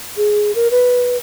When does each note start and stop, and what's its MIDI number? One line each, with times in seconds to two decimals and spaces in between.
0.17 0.54 68
0.55 0.71 70
0.71 1.17 71